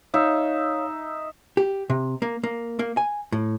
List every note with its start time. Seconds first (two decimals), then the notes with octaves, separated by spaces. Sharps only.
0.14 D#4 C#5 E5 F5
1.57 G4
1.90 C3
2.22 A#3
2.43 A#3
2.79 A#3
2.97 G#5
3.32 A2